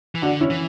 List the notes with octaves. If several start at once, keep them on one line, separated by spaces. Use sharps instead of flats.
E3
D3 D4 F#4
C#4 E4
E3